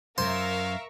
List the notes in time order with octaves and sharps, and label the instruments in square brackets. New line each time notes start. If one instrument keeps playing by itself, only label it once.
[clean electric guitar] F#2 [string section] A#4 E5 C#6 [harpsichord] C5 [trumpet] F5